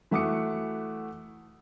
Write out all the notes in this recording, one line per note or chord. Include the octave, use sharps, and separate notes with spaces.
E3 A3 F#4 D6 D#6 C#7